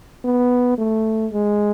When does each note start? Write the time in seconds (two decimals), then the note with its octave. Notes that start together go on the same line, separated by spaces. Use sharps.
0.24 B3
0.78 A3
1.32 G#3